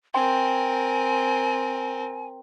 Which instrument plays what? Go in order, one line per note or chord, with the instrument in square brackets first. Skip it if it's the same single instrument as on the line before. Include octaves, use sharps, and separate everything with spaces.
[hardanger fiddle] C4 A#4 [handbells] G5 C6 [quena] G#5